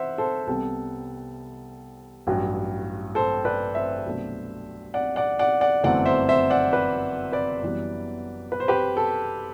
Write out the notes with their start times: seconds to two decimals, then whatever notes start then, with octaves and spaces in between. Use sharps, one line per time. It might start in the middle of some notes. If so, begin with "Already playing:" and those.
Already playing: C5 E5 F#5
0.18 A4 C5
0.47 C2 C3 G3 B3 A4
2.27 A1 G2 F#3
3.15 A4 C5
3.45 B4 D5
3.75 C5 E5
4.05 C2 B2 F#3 A3 D4
4.94 D5 F#5
5.16 D5 F#5
5.39 D5 F#5
5.61 D5 F#5
5.84 G1 F#2 E3 A3 C4 D5 F#5
6.05 C5 E5
6.29 C5 E5
6.50 D5 F#5
6.73 B4 D5
7.32 B4 D5
7.63 F#2 E3 G3 B3
8.52 B4
8.60 C5
8.68 G4 B4
8.97 A4